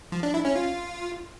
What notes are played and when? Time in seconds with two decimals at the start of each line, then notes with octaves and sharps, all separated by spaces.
0.12 F3
0.23 D4
0.34 E4
0.45 C#4
0.56 F4